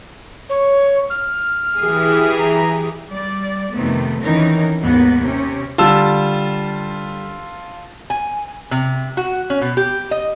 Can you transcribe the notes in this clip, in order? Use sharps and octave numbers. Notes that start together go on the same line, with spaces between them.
C#5
F6
E3 G4 G#4
A#5
G3 D5
F2 C3 D#3 A3 B3
F2 D#3 E3 C#4 D#4 A#4
D#2 G#2 A#3 B3
C3 C#4
D3 G3 F4 A5 E6
G#5
C3
F#4
C#4
B2
G4
D#5